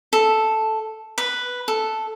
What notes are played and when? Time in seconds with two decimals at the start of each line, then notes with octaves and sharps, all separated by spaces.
0.13 A4
1.18 B4
1.68 A4